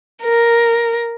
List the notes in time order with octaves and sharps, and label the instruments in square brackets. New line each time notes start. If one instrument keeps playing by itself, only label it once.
[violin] A#4